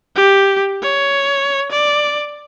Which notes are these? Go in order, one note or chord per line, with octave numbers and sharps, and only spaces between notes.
G4
C#5
D5